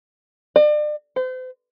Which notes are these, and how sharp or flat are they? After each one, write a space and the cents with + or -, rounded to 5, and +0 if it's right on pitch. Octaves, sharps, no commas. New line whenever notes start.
D5 +35
C5 -40